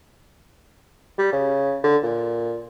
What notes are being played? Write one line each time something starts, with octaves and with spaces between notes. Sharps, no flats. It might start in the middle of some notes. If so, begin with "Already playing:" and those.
G3
C#3
D3
A#2